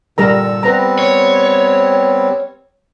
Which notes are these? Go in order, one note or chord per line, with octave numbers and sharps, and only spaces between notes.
A#2 D3 G3 A#4 A#5 E6
G3 B3 C4 B4 A#5
C#5